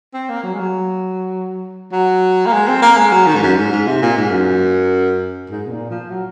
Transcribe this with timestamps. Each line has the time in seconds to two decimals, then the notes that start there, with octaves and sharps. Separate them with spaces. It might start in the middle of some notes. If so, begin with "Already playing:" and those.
0.14 C4
0.29 A#3
0.43 F#3
0.53 G#3
0.59 F#3
1.92 F#3
2.46 A#3
2.53 G#3
2.68 C4
2.82 A#3
2.97 G#3
3.12 F#3
3.27 D#3
3.35 G#2
3.43 F#2
3.57 G#2
3.72 G#2
3.87 C3
4.02 A#2
4.17 G#2
4.31 F#2
5.50 G#2
5.66 C3
5.70 A#2
5.90 F3
6.10 F#3